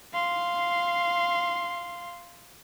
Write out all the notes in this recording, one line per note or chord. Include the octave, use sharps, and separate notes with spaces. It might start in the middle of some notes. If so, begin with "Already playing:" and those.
F5 C6